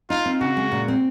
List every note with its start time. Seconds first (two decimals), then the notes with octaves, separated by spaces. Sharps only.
0.10 D#4 F4
0.26 C4
0.41 C#3 F#4
0.57 G#3
0.72 A#2
0.88 C4